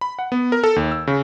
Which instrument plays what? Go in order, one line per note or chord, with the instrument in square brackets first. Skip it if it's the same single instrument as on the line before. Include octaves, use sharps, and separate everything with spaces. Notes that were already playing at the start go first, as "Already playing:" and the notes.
[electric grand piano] B5
F#5
B3
A#4
A4
D#2
E6
C#3